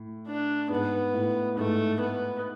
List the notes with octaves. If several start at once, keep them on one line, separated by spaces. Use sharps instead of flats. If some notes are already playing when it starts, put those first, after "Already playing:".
Already playing: A2
D4
G#2 B3
A2
G#2 A3
B3